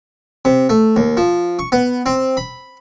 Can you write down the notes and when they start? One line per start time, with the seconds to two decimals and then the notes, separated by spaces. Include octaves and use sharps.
0.45 C3
0.69 A3
0.96 D#2
1.17 F3
1.59 C#6
1.72 B3
2.06 C4
2.37 B5